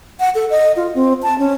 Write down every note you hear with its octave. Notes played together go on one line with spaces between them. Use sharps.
F#5
A4
D#5
F4
C4
A5
C#4